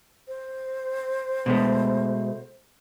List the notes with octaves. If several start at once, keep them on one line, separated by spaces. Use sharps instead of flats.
C5
B2 G#3 A3